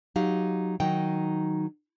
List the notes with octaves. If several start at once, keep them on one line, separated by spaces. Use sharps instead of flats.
F#3 D#4 G4 F5
D#3 F#3 D#4 G5